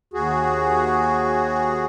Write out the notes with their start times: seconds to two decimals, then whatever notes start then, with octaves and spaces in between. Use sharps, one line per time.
0.14 D#2 F#4 G#4